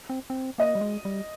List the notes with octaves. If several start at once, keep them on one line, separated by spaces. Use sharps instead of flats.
C4
C4
A#3 D#5
G3
G#3
G3